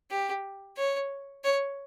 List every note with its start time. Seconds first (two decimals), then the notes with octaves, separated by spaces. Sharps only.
0.10 G4
0.77 C#5
1.44 C#5